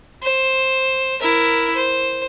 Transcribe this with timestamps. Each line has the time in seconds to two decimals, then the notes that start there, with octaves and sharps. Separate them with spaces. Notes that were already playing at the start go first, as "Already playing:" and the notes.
0.23 C5
1.21 E4 A#4
1.76 C5